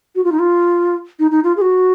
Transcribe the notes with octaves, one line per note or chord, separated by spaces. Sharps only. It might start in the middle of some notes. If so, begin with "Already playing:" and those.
F#4
F4
D#4
F4
D#4
D#4
F4
G#4
F#4